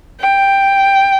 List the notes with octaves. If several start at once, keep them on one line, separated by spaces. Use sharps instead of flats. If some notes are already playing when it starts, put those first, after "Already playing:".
G5